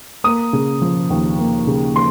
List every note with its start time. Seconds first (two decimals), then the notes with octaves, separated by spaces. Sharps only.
0.24 A#3 D#6
0.53 C#3
0.82 F3
1.10 D#2
1.38 A#3
1.67 C#3
1.96 F3 C6